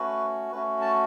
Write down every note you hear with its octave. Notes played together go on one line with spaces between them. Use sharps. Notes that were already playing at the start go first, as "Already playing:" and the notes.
Already playing: A3 C#4 F#4 B4
A3 C#4 F#4 B4
A5